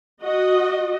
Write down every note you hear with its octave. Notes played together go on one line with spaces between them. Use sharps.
F#4 D#5